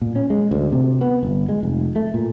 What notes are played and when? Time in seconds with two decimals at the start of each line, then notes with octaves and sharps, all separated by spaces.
0.02 A#2
0.16 C#4
0.30 G#3
0.51 D2
0.72 C3
1.01 B3
1.23 G1
1.49 G#3
1.63 F1
1.96 A3
2.14 A#2